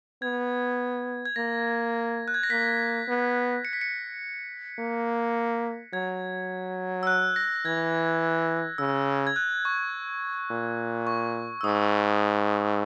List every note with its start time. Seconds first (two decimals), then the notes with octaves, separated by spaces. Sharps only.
0.22 B3 G#6
1.25 G#6
1.36 A#3 A#6
2.28 F#6
2.34 G#6
2.43 A#6
2.50 A#3 B6
3.08 B3
3.65 C#7
3.73 B6
3.81 C#7
4.79 A#3
5.93 F#3 G#6
7.03 E6
7.07 F#6
7.36 A#6
7.65 E3 G#6
8.78 C#3 E6
9.27 G#6
9.36 F#6
9.65 C#6
10.50 A#2
11.07 C#6
11.61 E6
11.64 G#2 D#6